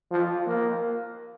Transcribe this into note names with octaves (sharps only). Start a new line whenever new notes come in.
F3
A#3